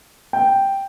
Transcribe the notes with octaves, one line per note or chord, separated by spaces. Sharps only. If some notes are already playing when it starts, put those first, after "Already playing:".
G5